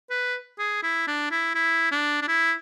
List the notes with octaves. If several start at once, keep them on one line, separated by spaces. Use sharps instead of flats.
B4
G#4
E4
D4
E4
E4
D4
D4
E4